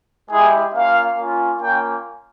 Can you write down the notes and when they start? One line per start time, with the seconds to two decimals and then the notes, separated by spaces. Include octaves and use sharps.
0.31 G#3 E4 G4 G#4
0.74 A#3 C#4 F4 F5
1.18 A#3 C#4 F4
1.61 A#3 C#4 F4 G5